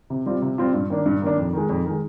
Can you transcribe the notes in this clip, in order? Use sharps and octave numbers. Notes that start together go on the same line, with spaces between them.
C3
G3 C4 F4
C3
G3 C4 F4
G2
D#3 A#3 D4
G2
D#3 A#3 D4
F2
D#3 G#3
F2
D#3 G#3